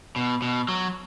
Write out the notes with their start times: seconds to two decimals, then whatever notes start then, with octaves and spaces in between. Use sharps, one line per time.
0.16 B2
0.42 B2
0.68 F#3